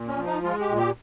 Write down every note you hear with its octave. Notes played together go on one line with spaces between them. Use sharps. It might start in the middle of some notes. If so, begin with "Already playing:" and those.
Already playing: A#2
C#4
F3
D#4
G#3 F4
G4
A#2
G4